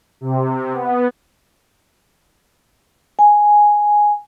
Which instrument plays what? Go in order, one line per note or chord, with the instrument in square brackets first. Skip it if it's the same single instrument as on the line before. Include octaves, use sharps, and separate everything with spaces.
[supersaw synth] C3
B3
[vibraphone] G#5